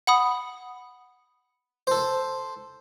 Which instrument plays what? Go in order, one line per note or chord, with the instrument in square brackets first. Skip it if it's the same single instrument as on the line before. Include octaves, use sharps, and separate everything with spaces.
[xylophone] F#5 B5 D#6
[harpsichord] A4 C5